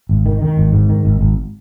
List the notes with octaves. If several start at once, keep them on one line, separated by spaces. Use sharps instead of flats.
G#1
D#3
D#3
G#1
G#2
D#3
G#1
G#1